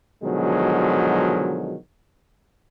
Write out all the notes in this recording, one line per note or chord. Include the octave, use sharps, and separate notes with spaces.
B2 D3 D#3 F3 F#3 G#3